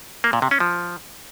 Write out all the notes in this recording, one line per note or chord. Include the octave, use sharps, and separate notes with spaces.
A#3
A#2
C3
C#4
F3